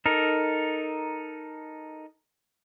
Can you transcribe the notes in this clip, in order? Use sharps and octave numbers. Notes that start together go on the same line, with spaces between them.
D#4 A4 A#4